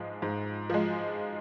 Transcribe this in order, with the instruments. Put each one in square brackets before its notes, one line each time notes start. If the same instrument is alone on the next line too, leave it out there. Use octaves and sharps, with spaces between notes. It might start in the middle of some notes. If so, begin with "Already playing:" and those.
Already playing: [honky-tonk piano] G#2 F3 G#3
G#2
F3 G#3